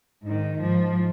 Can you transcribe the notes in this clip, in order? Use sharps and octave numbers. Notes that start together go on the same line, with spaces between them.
G#2 D#3
G#2 F3